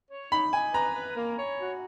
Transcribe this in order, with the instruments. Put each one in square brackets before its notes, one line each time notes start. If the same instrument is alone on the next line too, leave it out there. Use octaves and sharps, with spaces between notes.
[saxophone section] C#5
[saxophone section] D#4 [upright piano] B5
[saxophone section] D#4 [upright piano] G#5
[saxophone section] B4 [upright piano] A#5
[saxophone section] B4
A#3
C#5
F#4